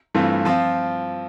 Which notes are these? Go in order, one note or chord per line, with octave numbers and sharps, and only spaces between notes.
G2 E3 A3 C4 F4
F3 C4 F4